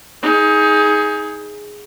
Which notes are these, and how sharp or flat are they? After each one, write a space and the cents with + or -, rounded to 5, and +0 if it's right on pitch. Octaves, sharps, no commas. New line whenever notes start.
D#4 +25 G#4 +0